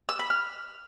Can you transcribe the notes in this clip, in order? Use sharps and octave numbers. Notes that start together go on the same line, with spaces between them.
E6
B5
F6